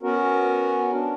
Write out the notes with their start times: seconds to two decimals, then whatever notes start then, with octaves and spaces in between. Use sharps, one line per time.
0.03 B3 C#4 F#4 A#4
0.91 D4